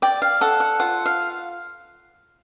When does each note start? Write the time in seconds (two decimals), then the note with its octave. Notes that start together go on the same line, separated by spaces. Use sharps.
0.02 D5 G5
0.22 F5
0.41 A4 F#5
0.60 F#5
0.80 F4 F#5
1.06 F5